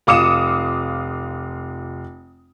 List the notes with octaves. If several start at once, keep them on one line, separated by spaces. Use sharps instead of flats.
F1 F4 D6 D#6 C#7 E7